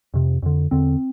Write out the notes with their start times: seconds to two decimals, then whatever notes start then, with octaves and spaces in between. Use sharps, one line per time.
0.14 F2 C3
0.42 F2 D3
0.71 E2 D3 C4